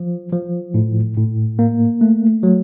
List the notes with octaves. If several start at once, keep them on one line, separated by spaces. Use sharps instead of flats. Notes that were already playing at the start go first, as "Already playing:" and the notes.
Already playing: F3
F3
A2
A2
A#3
A3
F#3